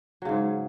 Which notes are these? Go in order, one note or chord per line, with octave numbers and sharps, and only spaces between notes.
G#2 C#3 F#3